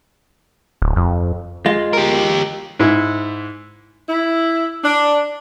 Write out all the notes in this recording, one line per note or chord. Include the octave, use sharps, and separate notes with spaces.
D1
F2
G#3 F4
G4 A#4
G#2 E4
E4
D4